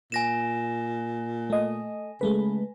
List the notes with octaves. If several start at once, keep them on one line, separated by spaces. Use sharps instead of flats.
A#2 G#5 A#6 E7
A3 D#5
C#3 G#3 A3 B4